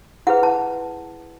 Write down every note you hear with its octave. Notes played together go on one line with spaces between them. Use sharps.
E4 G#4 B4 F#5
A5